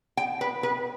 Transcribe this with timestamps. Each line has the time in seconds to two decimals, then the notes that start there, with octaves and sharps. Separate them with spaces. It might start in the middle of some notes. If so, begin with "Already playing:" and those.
0.17 G5
0.41 B4
0.63 B4